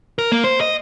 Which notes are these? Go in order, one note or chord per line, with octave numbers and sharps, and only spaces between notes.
A#4
A#3
C5
D#5